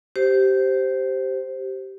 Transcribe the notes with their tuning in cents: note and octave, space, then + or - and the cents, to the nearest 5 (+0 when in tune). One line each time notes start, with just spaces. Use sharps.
G4 -15 C5 +0